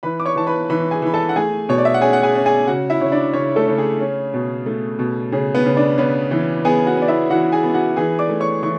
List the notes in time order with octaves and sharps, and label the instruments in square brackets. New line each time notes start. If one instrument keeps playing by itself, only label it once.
[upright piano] E3 B4 B5
D6
C#5 C#6
E3 A5
B4 B5
E3 B4 B5
G#4 G#5
E3 B5
A4 A5
F#5
A3 G#4 G#5
B2 C#5
D5
E5
F#5
C#4 G#4 G#5
F#5
G#4 G#5
C#4
G#4 G#5
C#3 F#4 F#5
E4 E5
C#3 C#5
D4 D5
C#3 C#4 C#5
A3 A4
C#3
G#4
C#4
B2
A3
B2
C#3 G#4
B3 B4
C#3
D4 D5
C#3 B3 B4
E3
B3 G#4 G#5
F#4 F#5
B3 D5
E4 E5
E3 F#4 F#5
G#4 G#5
B3
F#4 F#5
E3 G#4 G#5
D5 D6
A3
C#5 C#6
E3 C#6